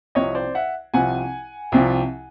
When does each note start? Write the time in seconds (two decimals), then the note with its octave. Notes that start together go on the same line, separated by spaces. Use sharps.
0.15 C2 C3 F3 C#5 D#5
0.35 C5 D5
0.55 E5 F#5
0.94 C2 C3 F3 F#5 G#5
1.72 C2 C3 F3